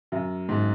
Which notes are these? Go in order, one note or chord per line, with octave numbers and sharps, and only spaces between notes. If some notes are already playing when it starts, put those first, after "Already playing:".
F#2
G#2